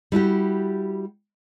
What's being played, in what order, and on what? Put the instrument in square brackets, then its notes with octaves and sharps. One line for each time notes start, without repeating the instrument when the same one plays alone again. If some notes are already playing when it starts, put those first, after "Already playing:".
[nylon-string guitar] G3 E4 F#4 G4